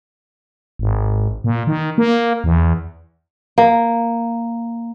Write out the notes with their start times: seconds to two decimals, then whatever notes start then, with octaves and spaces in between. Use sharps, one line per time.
0.79 G#1
1.44 A#2
1.67 D#3
1.98 A#3
2.44 E2
3.58 A#3